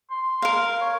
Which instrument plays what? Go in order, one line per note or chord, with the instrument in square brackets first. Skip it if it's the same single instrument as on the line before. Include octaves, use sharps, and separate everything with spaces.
[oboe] C6
[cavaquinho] A#4 F5
[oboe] C#5